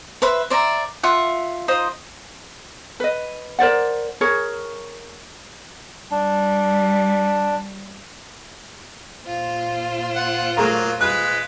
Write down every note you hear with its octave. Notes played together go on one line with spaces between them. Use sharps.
B4 C5 E5 B5
C5 D5 E5 A#5
F4 E5 F#5
D#4 F4 C5 D#5
B4 D#5
A#4 C5 D5 F#5
G#4 A#4 C#5
G3 D4
A#2 F4 C5
F#5
F#3 A3 A#3 G#4 A#5
G#3 B4 F#6